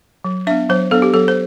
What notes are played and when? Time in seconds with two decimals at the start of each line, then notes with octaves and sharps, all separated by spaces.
0.24 F#3
0.47 D4 E5
0.51 B3
0.69 F#3 C5
0.91 B3 D4 A4
1.02 G4
1.14 F#3 A4
1.28 C5